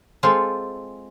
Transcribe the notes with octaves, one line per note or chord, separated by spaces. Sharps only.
G#3 C4 F4 A4